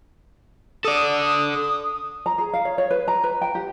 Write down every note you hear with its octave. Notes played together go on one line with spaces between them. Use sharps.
A4 D5 D#6
A#5
G#4
F5
C#5
C#5
B4
A#5
B4
G5
G4